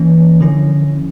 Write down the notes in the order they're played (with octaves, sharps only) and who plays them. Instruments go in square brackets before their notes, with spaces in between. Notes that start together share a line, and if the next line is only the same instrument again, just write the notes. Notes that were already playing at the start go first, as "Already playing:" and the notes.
Already playing: [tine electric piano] E3 A#3 C#4
D3 F3 C#4 E4